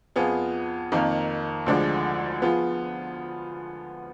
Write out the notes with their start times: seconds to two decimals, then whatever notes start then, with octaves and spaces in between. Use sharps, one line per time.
0.16 F2 F3 B3 F4 G#4
0.92 F2 D#3 A#3
1.66 D2 D3 F3 G#3 D4
2.42 F3 B3 F4 G#4